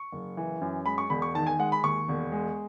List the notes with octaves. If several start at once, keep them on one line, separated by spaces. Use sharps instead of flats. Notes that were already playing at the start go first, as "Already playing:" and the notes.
Already playing: C#6
F#1
E3
F#2
G#3 B5
C#6
E1 B5
C#6
D#3 A5
G#5
G#3 F#5
B5
D#2 C#6
E1
G#3